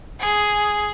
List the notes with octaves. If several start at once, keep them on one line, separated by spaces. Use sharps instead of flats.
G#4